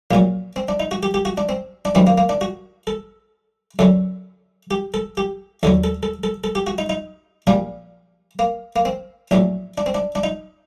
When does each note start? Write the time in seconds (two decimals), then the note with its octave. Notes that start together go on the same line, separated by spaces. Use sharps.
0.11 A#1 A#2 F#3 A#3
0.56 C4
0.69 D4
0.80 D#4
0.91 F#4
1.03 G4
1.14 G4
1.25 F#4
1.38 D4
1.49 C4
1.85 D4
1.95 F#2 D#3 G3 C4
2.07 A#3
2.18 A#3
2.29 D4
2.41 F#4
2.87 A4
3.79 F#2 D3 F#3 A4
4.71 G4
4.94 A4
5.17 G4
5.63 D#2 D3 F#3 A4
5.84 A4
6.03 A4
6.24 A4
6.44 A4
6.55 G4
6.67 F#4
6.78 D#4
6.90 D#4
7.47 A#1 A#2 G3 D4
8.39 A#3
8.76 A#3
8.85 C4
9.31 A#1 A2 F#3 D4
9.78 D4
9.86 C4
9.95 D4
10.15 D4
10.24 D#4